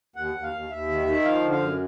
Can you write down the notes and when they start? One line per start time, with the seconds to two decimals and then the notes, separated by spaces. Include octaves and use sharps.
0.16 D#2 F#5
0.35 D#2
0.43 F5
0.53 D#2
0.70 D#2 E5
0.88 D#3
1.07 D#3
1.24 F3 F5
1.42 D3
1.51 F5
1.60 F#2